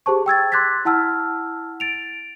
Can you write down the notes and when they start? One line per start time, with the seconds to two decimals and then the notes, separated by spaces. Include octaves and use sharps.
0.06 G4 G#4 C5 A5 C#6
0.26 G5 E6 G#6 A6
0.52 C6 D6 F#6 G#6 A6 B6
0.85 E4 F#5 A5 E6 F6
1.80 A6 D7 F7